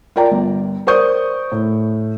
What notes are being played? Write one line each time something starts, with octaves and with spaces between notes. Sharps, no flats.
F4 A#4 D5 G5 A#5
G1
A#4 C5 D5 C#6 D#6 G6
A2